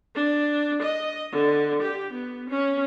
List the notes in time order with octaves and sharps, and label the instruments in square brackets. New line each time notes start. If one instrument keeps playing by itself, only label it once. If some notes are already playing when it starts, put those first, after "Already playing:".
[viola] D4
D#5
D3
G4
B3
C#4